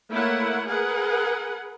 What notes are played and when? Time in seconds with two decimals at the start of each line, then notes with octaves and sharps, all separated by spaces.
0.11 A3 A#3 E4 A#4 C#5 F#5
0.68 G#4 A#4 B4 F#5